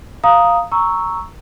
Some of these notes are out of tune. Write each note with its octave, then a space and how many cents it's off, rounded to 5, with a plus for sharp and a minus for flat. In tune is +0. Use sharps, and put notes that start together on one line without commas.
F5 +0 A#5 +0 D#6 +0
A#5 +0 C#6 +0 E6 -5